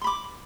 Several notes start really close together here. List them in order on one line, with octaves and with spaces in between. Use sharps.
C6 B5 D6